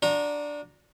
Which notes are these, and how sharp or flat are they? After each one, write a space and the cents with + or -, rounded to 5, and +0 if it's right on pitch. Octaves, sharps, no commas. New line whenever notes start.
D4 +0 F#4 -40 A#5 +0